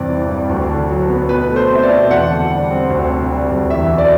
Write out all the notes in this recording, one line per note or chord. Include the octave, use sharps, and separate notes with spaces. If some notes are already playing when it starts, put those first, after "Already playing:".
Already playing: E2 G2 C3 D5
E3
G3
D2
D3
F#3
B3
B2 B4
A3
C5
C4 E5
D5
B2
E2 F#5
D3
G3
C4
D2
C3
G3
D2
E2 E5
B2
D5